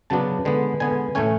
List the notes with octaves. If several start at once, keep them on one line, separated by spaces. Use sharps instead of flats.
C#3 F#3 B3 D4 A5
D3 G#3 B3
D3 G#3 B3 G#5
A2 E3 A3 C#4 G#5